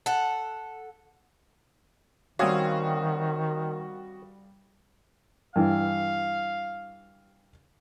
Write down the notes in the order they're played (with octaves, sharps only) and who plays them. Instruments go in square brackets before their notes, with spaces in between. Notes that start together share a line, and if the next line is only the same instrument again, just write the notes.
[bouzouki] A4 F#5
[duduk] D#3 [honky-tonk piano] G3 F5 [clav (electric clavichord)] C4 C#4 C#5 [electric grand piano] F#4 D#6
[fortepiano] G2 E3 [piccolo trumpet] F5